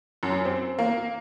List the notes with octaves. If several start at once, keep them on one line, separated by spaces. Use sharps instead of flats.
F#2
C4
A#3